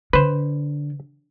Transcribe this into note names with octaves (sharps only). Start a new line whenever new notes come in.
D3 B4 C5